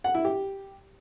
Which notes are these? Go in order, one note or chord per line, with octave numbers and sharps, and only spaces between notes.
F#5
E4
G4